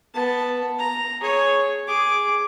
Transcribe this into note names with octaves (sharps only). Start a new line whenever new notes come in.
B3 A5
A#5
G#4 C#5
G#4 D6